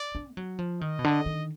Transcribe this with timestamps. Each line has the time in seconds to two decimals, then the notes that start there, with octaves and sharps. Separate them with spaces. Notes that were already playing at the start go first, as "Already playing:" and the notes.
Already playing: D5
0.15 D4
0.32 G#3
0.37 F#3
0.59 F3
0.81 D#3 D#5
0.99 B2
1.04 D3
1.26 D#3